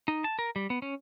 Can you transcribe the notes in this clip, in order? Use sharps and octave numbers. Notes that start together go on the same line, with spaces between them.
D#4
A5
A#4
G3
B3
C#4